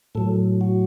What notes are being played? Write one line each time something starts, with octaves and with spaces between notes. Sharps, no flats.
A2 F#3 A4
F#4